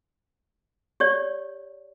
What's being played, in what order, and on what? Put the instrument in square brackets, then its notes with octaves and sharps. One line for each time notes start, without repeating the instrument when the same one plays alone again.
[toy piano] G4 C#5 D5